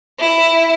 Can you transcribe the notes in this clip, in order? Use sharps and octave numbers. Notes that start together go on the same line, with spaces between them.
E4